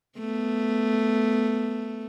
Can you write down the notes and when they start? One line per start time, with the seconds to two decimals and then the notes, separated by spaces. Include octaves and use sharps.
0.19 A3 B3